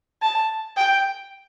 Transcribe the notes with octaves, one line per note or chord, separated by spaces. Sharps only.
A5
G5